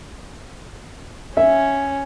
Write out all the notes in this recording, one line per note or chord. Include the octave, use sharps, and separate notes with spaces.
C#4 E5